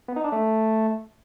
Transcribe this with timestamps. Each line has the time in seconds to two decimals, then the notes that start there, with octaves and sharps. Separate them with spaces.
0.08 B3
0.16 D#4
0.24 D4
0.32 A3